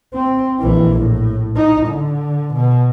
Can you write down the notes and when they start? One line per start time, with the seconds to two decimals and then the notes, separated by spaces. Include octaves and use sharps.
0.13 C4
0.60 A#1 E3
0.99 A2
1.56 D#4
1.87 D3
2.54 B2